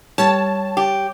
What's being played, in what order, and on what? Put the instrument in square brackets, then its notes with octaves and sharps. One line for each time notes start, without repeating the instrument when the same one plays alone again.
[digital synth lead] G3 [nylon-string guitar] C#5 [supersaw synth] A5
[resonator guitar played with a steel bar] G4